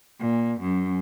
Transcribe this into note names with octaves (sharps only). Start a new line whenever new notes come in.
A#2
F#2